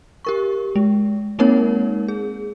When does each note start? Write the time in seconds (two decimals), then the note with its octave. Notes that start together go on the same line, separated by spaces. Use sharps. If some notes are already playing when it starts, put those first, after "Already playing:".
0.25 G4 A#4 C#6
0.76 G#3
1.39 G#3 A#3 C4 D#4 A#4 C#5
2.08 G#4